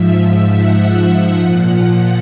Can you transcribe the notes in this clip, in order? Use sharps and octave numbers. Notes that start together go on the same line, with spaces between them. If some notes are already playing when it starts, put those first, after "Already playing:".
Already playing: G#2 F3 E5
F#5
A#2 F3